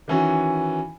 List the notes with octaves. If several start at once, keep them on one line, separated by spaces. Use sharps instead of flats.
D#3 E3 C#4 F#4